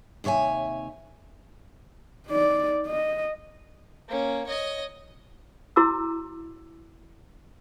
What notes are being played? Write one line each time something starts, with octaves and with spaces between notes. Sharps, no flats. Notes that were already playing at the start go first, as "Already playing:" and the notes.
D#2 C3 C#5 E5 G#5
D#4 D5
D#5
A#3 C#4
C#5 D#5
E4 F#4 A#5 D6 E6